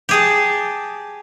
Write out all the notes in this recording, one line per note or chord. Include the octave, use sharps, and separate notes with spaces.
G4 G#4 A5